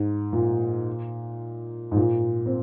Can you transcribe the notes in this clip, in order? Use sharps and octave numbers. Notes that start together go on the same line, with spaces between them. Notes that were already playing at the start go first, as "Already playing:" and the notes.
Already playing: G#2
A#2
G#2
A#2
C4